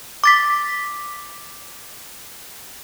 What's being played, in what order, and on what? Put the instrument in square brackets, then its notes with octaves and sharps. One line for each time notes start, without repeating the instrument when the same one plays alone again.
[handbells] D6 A6 B6